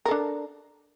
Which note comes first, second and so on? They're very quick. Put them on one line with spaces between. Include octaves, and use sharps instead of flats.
A#4 A4 D4